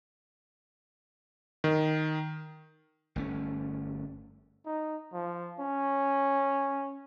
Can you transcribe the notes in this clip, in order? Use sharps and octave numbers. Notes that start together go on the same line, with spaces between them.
D#3
G1 A3 C#4
D#4
F3
C#4